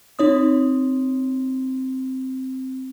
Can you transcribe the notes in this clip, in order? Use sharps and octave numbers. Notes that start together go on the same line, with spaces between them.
C4 D#4 C#5 D#6